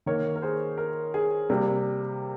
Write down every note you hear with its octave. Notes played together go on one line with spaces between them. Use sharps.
D#3 A#3 A#4 C#5
A#4
G#4 C5
A#4
G#4
C3 G3 A#3